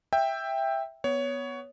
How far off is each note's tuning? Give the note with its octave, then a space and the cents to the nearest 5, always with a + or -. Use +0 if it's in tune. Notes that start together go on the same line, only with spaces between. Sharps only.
E5 +0 G5 +10
B3 +0 C#5 +15